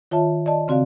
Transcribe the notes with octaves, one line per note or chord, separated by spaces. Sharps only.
D#3 F4 C#5 E5 A5
D5 D#5 A5
C#3 C4 F#4 D5 F5